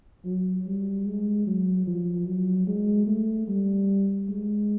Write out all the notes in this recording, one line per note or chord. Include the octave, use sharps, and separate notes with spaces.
F#3
G3
G#3
F#3
F3
F#3
G#3
A3
G3
G#3